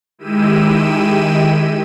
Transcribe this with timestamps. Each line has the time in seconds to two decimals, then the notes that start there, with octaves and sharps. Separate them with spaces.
0.18 D#3 G#3 E4 G4 E6 D#7